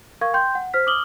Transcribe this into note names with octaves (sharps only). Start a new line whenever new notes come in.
A#4 F5 C#6 G#6
G5 C6 G6
F#5
C5 F6 B6
D6 D#6 F6 F#7 G7